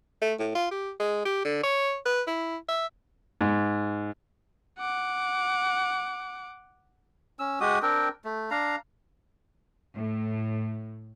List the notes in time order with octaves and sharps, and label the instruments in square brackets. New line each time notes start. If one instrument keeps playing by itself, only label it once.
[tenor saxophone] A3
A2
F4
G4
G#3
G4
D3
C#5
B4
E4
E5
[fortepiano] G#2
[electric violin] F#5 D6
[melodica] C#4 E6
G#3 F#4 G4 D#6
C4 D4 A#4 G5
A3
D4 F5 A#5
[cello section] A2